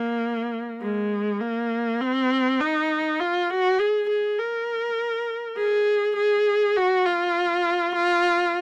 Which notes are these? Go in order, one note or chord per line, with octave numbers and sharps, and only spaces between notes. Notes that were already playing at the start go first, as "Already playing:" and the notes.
Already playing: A#3
G#3
A#3
C4
D#4
F4
F#4
G#4
G#4
A#4
G#4
G#4
F#4
F4
F4